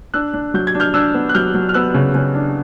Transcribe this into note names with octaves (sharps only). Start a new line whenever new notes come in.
D4 E6 F#6
D4
F#3 G6
G#6
D4
F6 G6
D4 E6 F#6
B3
F#6
F#3 F6 G6
F#3
F6
B3 E6 F#6
C#3
C#3
D4